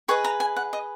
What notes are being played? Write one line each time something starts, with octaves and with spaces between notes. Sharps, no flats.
G#4 B4 D#5 C#6
A#5
G#5
F#5
D#5